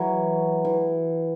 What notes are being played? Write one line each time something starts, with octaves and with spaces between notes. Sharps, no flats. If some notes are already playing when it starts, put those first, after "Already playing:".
Already playing: E3 F#3
E3